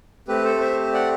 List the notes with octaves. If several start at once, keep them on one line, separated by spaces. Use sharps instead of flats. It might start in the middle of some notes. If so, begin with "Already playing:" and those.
A3 C4 G4 B4
A4 C5
C5 E5
D5 F#5